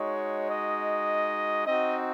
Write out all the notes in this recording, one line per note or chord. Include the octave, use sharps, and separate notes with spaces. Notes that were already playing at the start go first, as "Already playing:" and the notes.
Already playing: G#3 D#4 F#4 C#5
D#5
C4 D#4 F#4 D#5